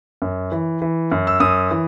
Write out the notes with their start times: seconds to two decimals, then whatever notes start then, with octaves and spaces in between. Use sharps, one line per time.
0.22 F#2
0.52 E3
0.82 E3
1.12 F#2
1.27 E6
1.40 F#2 D#6
1.71 E3